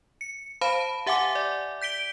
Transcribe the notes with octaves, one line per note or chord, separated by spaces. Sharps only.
C#7
C5 F5 A5 B5
G4 E5 F#5 G#5 D6
D5
G6 B6 D7 G7